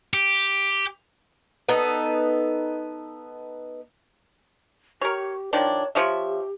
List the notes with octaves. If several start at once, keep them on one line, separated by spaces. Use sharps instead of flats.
G4
B3 D#4 A4
G4 A#4 C#5
D#3 F3 D4 C#5
F3 G4 C#5 E5